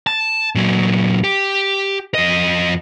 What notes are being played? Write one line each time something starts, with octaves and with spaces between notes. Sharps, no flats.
A5
A#2 F#3
G4
F2 D#5